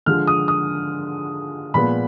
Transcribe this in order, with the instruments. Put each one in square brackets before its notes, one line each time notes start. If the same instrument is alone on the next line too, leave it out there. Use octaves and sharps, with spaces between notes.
[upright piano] D3 F3 G#3 F6
D#6
D#6
A#2 F3 G#3 B3 B5